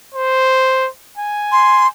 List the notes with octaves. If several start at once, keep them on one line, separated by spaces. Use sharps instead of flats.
C5
G#5
C6